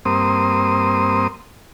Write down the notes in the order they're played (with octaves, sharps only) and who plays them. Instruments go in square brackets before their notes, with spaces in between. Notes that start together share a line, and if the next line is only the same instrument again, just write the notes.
[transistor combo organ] G2 A#3 C4 C5 D#6